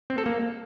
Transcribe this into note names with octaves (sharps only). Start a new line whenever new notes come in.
C4
A4
A#3